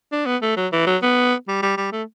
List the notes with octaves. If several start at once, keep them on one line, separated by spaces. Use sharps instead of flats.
D4
B3
A3
F#3
E3
F#3
B3
G3
G3
G3
A3